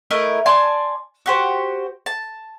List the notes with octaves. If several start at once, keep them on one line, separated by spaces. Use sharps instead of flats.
A3 E4 A#4 D#5
D5 G#5 A5 C6
F#4 G4 C5
A5